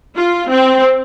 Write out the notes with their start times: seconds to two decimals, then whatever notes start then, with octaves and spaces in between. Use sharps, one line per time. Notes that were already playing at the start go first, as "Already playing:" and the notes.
0.16 F4
0.50 C4